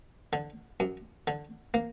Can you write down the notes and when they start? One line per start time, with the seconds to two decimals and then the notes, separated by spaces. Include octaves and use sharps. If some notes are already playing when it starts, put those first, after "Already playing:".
0.33 D3
0.80 F#2
1.27 D3
1.74 A#3